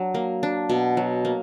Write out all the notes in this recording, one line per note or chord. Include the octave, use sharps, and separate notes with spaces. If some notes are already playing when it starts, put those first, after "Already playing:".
Already playing: F#3 D4
A#3
D4
B2
F#3
A#3